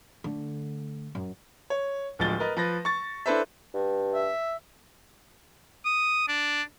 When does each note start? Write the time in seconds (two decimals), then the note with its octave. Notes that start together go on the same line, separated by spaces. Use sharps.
0.24 D3 A3
1.15 F#2
1.70 C#5
2.19 D1 F3 G#3 A6 G7
2.40 A#4 B4 D#5
2.57 F3 B4 A#6
2.85 C#6 A6
3.26 D4 E4 A4 B4 C5 E5
3.74 G2
4.15 E5
5.85 D#6
6.28 D4